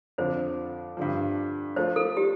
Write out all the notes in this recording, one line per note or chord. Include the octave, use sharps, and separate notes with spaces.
F2 D3 F3 C5
G2 D3 F3
F3 A3 F4 C5
A4
G4